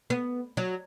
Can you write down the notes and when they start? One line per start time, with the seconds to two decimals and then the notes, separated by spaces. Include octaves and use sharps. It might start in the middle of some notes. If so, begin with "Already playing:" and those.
0.10 B3
0.57 F#3